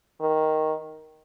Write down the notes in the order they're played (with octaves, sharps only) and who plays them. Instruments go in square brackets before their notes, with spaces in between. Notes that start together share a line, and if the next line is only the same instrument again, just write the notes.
[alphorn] D#3